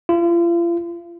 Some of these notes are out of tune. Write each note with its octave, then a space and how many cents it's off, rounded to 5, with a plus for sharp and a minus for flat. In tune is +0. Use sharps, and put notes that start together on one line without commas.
F4 -40